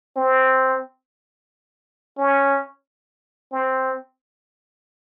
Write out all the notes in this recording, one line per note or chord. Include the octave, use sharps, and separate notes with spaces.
C4
C#4
C4